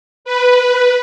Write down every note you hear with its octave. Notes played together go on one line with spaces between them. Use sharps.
B4